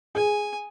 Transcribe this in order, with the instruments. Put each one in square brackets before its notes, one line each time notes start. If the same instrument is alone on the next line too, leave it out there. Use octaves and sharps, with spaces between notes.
[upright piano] G#4 [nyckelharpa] G#5